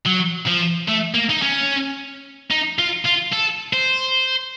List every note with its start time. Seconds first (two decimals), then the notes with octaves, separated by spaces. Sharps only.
0.06 F#3
0.47 F3
0.88 A3
1.15 A#3
1.30 D#4
1.42 C#4
2.50 D#4
2.79 F4
3.05 F4
3.33 A4
3.73 C5